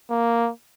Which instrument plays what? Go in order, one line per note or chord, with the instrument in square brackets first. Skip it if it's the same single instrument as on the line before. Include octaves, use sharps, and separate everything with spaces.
[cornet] A#3